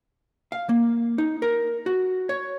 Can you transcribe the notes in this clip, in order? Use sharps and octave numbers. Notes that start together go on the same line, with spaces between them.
F5
A#3
D#4
A#4
F#4
C#5